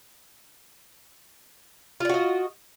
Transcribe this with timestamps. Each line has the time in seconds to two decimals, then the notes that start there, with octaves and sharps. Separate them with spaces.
2.00 F4
2.05 D5
2.09 F#4
2.14 D#5